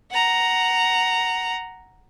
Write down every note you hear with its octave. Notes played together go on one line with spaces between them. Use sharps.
F#5 A#5